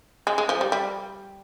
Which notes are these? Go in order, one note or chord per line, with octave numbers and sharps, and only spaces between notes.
G#3
G#3
F3
G3
G3